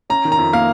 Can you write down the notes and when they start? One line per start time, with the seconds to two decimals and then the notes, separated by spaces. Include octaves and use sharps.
0.10 C#4 A#5
0.25 D#3
0.32 A#5
0.38 F2
0.53 A#3 F5